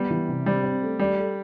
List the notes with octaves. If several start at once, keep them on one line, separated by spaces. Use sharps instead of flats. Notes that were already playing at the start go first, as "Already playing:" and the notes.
Already playing: G3 B3
E3
C3
G3 C4
C4
A3
G3 D5
A4